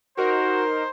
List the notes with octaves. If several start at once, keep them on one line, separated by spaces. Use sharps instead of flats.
D#4 F#4 A#4 C5